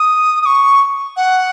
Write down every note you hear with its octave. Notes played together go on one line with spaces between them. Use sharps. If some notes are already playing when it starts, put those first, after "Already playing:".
Already playing: D#6
D#6
C#6
F#5